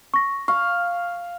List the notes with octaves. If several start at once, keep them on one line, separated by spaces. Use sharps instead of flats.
C#6 A#6
F5 C#6